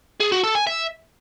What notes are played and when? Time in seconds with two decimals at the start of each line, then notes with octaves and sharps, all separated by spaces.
0.20 G#4
0.32 F#4
0.43 A4
0.55 G#5
0.67 E5